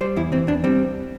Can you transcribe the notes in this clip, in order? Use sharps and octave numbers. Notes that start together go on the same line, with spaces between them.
G3 C5
E2 E4
E3 C4
E2 D4
G3 C4